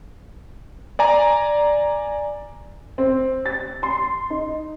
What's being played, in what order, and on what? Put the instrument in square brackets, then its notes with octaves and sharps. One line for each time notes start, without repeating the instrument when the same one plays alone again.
[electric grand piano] D5 G#5 A#5
[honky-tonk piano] C4
A6
C6
D#4